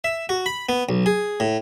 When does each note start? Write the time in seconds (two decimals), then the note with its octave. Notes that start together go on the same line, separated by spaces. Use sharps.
0.04 E5
0.29 F#4
0.46 B5
0.69 B3
0.89 B1
1.06 G#4
1.40 A2